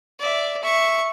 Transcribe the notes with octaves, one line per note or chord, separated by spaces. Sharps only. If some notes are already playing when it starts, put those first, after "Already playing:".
D5 E5
E5 C#6